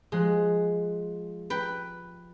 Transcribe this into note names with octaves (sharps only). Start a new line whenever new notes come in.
F3 G#3 F#6
B4 G5